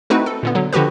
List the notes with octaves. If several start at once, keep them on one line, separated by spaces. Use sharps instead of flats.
A3 C4 D#4 E4 F#4 B4
A4
A#2 D3 B3
D3 F#3
D3 F3 F#4 G4 B4